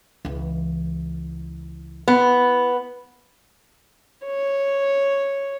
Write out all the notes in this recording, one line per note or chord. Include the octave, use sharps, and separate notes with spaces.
C#2 E3
B3 E4
C#5